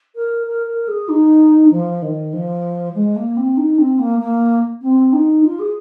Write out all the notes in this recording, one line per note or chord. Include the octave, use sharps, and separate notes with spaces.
A#4
A#4
A#4
G#4
D#4
F3
D#3
F3
G#3
A#3
C4
D#4
C4
A#3
A#3
C4
D#4
F4
G#4